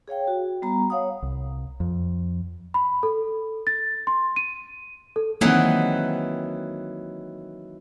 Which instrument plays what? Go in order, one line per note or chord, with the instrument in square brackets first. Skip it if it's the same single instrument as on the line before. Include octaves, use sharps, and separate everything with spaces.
[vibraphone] G#4 C#5 F5 G5
F#4
G3 B3 A#5
C#5 F5 F#5 D#6
[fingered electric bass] C2
F2
[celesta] B5
A4
A6
C6
D#7
A4
[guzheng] D#3 E3 F#3 [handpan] A#3 C4